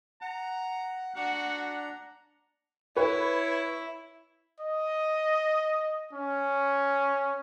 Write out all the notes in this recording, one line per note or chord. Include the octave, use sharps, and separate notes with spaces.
F#5 A#5
D4 F#4 F#5 A#5
E4 B4 C#5
D#5
C#4